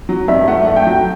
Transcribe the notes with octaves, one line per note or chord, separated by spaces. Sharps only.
F#3
G2 E5
A3 F#5
A3
G5
F#3